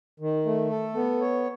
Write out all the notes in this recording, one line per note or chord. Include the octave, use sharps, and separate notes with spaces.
D#3
A3
A4
B3
C#5